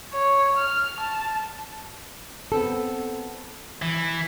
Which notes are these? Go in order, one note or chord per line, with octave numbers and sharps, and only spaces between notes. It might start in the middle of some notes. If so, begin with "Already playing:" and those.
C#5
F6
A5
B3 C4 A4
E3